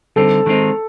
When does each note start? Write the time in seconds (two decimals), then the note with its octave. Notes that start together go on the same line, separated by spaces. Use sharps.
0.16 D3 G3 C4 D#4 A4
0.46 D#3 G#3 C4 D#4